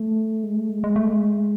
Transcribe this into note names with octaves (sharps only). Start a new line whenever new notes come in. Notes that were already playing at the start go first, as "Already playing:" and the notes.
Already playing: A3
G#3
A3
G#3
G#3
A3
G#3